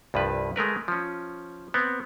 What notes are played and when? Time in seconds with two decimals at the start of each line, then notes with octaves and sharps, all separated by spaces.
0.14 C2 G2 F3 B4
0.56 G#3 A3 A#4 B4
0.88 F3 C#4
1.74 B3 C4